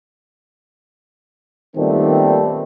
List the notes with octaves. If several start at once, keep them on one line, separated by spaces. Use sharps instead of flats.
A#2 D#3 G3 A3 B3 C4